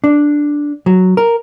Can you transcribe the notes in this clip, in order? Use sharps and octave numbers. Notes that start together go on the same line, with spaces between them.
D4
F#3
A#4